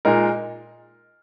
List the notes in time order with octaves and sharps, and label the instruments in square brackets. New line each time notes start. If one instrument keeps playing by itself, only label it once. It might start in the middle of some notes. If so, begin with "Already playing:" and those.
[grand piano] A#2 G#3 D#4 A#4